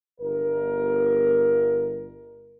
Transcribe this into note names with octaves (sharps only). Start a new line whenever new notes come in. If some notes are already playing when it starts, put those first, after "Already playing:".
G1 A#4